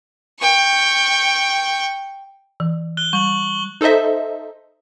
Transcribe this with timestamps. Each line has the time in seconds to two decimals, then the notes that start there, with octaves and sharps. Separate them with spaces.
0.40 G5 C#6
2.60 E3
2.97 F#6 G7
3.13 G3 C#6 F#7
3.81 D#4 A4 C5 D#5 E5